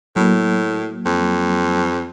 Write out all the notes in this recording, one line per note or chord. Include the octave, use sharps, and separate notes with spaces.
A2 F#3 A#3
F2